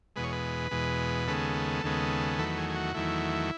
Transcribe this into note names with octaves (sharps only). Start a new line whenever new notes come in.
E2 B2 G#3 B4
C#5
B4
E2 B2 G#3
D#2 C#3 G#3 B3 A4
D#2 C#3 G#3 B3
E2 D#3 F#3 A3 B4
G#4
G#4
F#4
E2 D#3 F#3 A3 E4